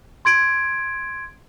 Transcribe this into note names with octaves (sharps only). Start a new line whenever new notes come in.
C6 G#6 D7